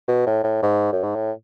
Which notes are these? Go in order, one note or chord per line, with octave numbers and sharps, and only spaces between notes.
B2
A2
A2
G#2
F#2
G#2
A2